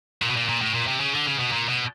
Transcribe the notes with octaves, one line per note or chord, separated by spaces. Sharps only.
A#2
B2
A#2
A#2
A2
A#2
C3
C#3
D3
C#3
B2
A#2
B2